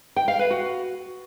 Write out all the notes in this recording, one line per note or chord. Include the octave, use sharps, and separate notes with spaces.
G5
F5
B4
F#4